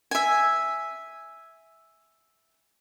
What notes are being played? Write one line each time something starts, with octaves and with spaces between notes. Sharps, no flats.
E5 G#5